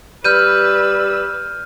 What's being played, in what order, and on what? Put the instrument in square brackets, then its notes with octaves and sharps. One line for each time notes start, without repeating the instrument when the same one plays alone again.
[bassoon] G3 [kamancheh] B4 E6 [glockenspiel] F6 G6 D#7